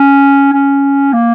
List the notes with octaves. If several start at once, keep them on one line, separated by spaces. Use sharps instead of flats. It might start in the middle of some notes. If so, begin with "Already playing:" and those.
Already playing: C#4
C#4
A#3